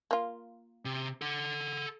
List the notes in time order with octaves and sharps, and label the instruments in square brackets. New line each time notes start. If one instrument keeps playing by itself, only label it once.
[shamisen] A#3 F4
[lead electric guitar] C3
A4 F#5